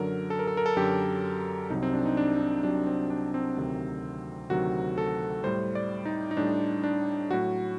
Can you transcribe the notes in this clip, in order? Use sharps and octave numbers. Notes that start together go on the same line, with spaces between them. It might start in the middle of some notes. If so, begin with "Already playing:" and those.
Already playing: F#2 D3 F#3 A#4
A4
A#4
A4
A#4
A4
F#2 D3 F#3 G4
C2 C3 F#3 D#4
C4
D4
D#4
D4
D#4
C2 C3 F#3 D4
C4
D4
C4
D2 C3 D#3 F#3
D2 C3 D#3 F#3 F#4
A4
A2 G3 C5
D5
D#4
D#4
A2 G3 D4
D4
A2 F#3 F#4